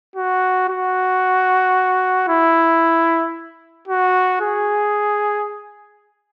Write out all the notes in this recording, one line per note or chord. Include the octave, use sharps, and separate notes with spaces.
F#4
F#4
E4
F#4
G#4